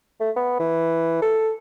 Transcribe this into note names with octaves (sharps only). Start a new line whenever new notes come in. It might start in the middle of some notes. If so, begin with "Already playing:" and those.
A3
B3
E3
A4